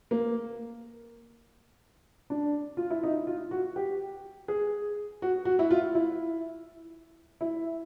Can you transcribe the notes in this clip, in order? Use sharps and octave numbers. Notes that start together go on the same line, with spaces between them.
A#3
D4
F4
E4
D#4
F4
F#4
G4
G#4
F#4
F#4
E4
F4
E4
E4